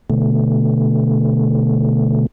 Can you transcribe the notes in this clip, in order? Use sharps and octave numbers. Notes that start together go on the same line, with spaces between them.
B2 D3 A3